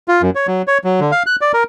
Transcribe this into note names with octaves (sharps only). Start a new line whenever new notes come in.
F4
F#2
C#5
F#3
C#5
F#3
D3
F5
F#6
D5
A#4